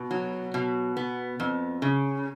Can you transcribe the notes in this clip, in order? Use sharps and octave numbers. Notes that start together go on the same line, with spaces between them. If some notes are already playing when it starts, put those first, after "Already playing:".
Already playing: B2
F#3
B2
B3
F2
C#3